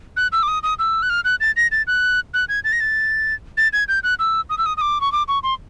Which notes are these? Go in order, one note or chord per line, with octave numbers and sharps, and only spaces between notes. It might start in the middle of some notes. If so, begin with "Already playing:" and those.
F#6
E6
D6
D#6
D#6
E6
F#6
F6
F#6
A6
A#6
A6
F#6
F#6
G#6
A6
A#6
A6
A6
G#6
G6
F#6
E6
D#6
E6
D#6
D#6
D6
C#6
D6
C#6
C6